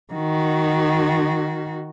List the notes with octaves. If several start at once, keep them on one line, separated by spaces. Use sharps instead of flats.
D#3 F#4